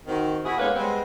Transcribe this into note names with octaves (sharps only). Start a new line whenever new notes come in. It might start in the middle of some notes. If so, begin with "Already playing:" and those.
D#3 C4 F#4
E4 F#4 G#4
D3 G#3 A#3 B3 B4 C#5
G3 G#3 B3 C4